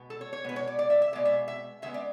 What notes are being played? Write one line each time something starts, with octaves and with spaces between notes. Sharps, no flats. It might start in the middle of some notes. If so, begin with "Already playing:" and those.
Already playing: B2 G#3 B3
A4
C#5
C#5
B2 G#3 B3 B4
C#5
D5
D5
E5
E5
B2 G#3 B3 D5
E5
E5
C#3 G#3 B3 E5
D5